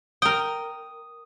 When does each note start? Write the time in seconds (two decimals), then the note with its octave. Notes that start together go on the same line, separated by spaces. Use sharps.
0.22 A#4 G5 D#6